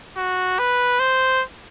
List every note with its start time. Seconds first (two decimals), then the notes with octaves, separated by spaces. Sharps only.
0.17 F#4
0.59 B4
0.99 C5